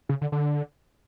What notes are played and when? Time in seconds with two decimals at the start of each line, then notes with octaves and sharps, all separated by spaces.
0.09 C#3
0.21 D3
0.32 D3